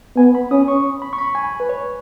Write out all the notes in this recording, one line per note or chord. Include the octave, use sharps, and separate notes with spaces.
B3 G#5
B5
C#4 D#6
C#6
B5
C#6
B5
G#5
B4
C#5